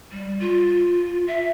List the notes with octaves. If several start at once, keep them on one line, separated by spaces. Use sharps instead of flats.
G3
F4
E5